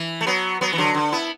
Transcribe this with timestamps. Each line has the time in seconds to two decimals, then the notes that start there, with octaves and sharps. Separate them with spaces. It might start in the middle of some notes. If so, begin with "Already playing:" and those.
Already playing: E3
0.21 A3
0.27 F#3 B3
0.61 F#3 B3
0.73 E3
0.78 D3 F#3
0.95 D3
1.12 B3 E4